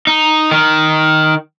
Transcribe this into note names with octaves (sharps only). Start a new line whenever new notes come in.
D#4
D#3